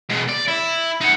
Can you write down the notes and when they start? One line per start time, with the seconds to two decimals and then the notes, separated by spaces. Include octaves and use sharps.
0.10 B2 G#3
0.29 D5
0.48 E4
1.01 D#4 F#5